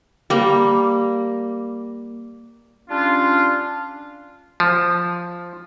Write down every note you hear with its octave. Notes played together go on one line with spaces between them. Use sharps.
G3 A#3
G3 C#4 D4 F4
F3